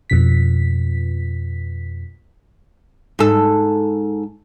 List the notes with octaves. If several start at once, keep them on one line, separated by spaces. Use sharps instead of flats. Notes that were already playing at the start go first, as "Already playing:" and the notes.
F2 B2 B6
G#2 A4